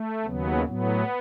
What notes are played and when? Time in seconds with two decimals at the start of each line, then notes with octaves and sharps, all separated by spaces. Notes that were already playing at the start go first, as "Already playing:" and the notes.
Already playing: A3
0.24 D#2 C#3 F#3 B3
0.65 A2 F#3 B3